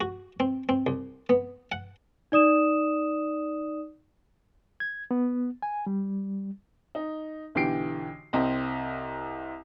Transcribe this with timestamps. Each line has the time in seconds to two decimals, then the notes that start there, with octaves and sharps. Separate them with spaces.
0.01 F#4
0.40 C4
0.69 C4
0.87 C2
1.29 B3
1.72 F#5
2.32 D#4 D5 D#6 E7
4.80 G#6
5.11 B3
5.62 G#5
5.86 G3
6.95 D#4
7.55 B1 D3 E3 G4 C7 D7
8.33 C2 C4 D#5 A#5